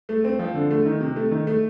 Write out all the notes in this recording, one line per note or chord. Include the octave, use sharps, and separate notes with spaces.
A3
C4
F3
D3
A3
D#3
C3
A3
D#3
A3